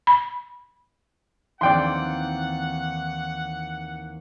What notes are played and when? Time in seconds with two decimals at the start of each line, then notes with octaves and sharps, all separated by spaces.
0.07 B5
1.61 D#2 E3 C4 D5 F#5 G5 C6